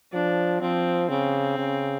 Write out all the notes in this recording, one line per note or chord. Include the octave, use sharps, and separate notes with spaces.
F3 D4
F3 C4
C#3 C4
C#3